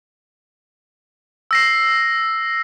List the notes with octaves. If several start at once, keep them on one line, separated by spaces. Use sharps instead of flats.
E6 A#6 C7